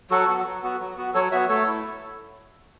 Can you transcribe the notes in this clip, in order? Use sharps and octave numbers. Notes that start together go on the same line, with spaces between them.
F#3 F#4 A4
B3 F#4
F#3
B3 F#4
F#3
B3 F#4
F#3 A4 C#5
B3 F#4 C#5 E5
A3 A4 C#5
E4